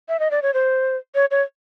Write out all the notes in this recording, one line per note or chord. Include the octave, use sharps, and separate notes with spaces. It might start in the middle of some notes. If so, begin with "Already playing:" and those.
E5
D#5
D5
C#5
C5
C#5
C#5